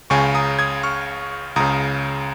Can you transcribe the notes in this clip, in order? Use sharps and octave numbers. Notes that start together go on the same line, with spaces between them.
C#2 C#3 G#5 C#6
A#5 D#6
D#6 G#6
C#6 F6
C#2 C#3 A#5 D#6